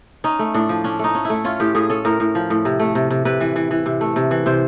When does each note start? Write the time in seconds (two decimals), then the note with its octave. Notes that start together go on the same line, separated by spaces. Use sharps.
0.24 C#4 D#4
0.39 A3
0.54 A2 D4
0.69 F3
0.84 C#4 D4
0.99 A3 D#4
1.15 C#4
1.25 A3 E4
1.44 C#4 F4
1.60 A2 G4
1.75 A2 G#4
1.90 C#4 A4
2.05 A2 A#4
2.20 A2
2.35 F3
2.50 A2
2.65 C3
2.80 A3
2.95 C3
3.10 C3
3.25 C3 B4
3.41 E3
3.56 E3
3.71 E3
3.86 C3
4.01 A3
4.16 C3
4.31 E3
4.46 C3 C5